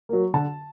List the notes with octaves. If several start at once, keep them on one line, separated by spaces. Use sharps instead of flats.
F#3 A#3
D3 A5